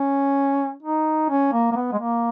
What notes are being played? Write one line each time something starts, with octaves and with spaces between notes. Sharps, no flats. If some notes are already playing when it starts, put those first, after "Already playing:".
Already playing: C#4
D#4
C#4
A#3
A#3
B3
G#3
A#3